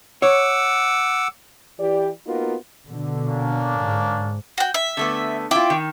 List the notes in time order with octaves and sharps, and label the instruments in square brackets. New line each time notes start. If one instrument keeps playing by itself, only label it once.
[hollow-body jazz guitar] C#5 [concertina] F#5 D6 E6
[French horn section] E3 G4 D5
A#3 B3 D#4 F4 F#4 A#4
[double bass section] B2 D3
[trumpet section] A#3 C#4 D4
[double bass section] G#2
[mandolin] F#4 G5
E5
[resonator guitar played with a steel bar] D3 A3 B3
[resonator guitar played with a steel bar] E4 F4 [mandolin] G5 D6
[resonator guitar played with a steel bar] D#3